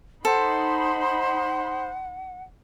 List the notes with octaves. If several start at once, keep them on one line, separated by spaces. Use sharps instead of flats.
D#4 A4 C5 F#5 B5 C6